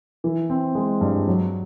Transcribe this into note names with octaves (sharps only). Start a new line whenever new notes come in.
E3
C4
G#3
G2
F#3